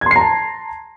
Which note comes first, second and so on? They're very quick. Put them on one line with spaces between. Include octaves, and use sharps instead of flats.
G#6 C6 C7 A#5 A5